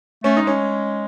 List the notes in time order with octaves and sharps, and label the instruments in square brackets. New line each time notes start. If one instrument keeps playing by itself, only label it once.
[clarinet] A3 [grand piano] C#4
[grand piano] D#4
[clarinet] G#3
[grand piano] C#4